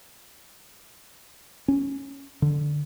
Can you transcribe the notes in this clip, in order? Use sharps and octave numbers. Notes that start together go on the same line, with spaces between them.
C#4
D3